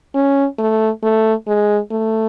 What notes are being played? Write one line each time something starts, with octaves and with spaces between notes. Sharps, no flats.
C#4
A3
A3
G#3
A3